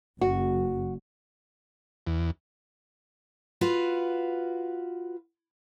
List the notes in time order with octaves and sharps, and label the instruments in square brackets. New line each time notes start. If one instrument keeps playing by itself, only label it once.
[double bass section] F#1 [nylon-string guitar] F#4
[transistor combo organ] E2
[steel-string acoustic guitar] F4 F#4 B4